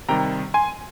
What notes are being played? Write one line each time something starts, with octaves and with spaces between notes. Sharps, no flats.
C3 D#3 G3 G5 A#5
G#5 C6